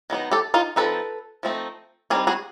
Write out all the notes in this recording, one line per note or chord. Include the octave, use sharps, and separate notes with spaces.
D#3 F#3 B3 D#4
G4 A4
D#4 F4
F3 A3 C4 D#4 A4 B4
F3 A3 C4 D#4
G3 C4 D#4 G#4 A#4
F#4 G#4